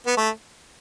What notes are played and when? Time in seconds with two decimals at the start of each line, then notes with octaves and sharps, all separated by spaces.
0.06 B3
0.17 A3